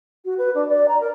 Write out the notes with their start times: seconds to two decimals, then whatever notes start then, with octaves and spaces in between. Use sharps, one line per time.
0.25 F#4
0.38 B4
0.54 D4
0.68 D5
0.88 A#5
1.00 A#4